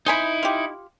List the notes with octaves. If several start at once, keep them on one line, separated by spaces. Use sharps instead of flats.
D#4 E4 C5 G#5 B5
F4 G4